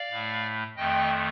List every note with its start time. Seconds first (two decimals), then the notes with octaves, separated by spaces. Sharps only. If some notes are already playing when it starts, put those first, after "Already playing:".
Already playing: D5 F5
0.11 A2 A3
0.76 F2 D#3 A3 D#5 G5